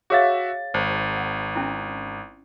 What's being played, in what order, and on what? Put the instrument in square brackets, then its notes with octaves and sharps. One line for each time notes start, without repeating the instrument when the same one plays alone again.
[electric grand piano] F#4 E5 A6 [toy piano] G#4 C#5 F5
[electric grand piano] G#1 [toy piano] C5
[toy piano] F#5
C#4 E4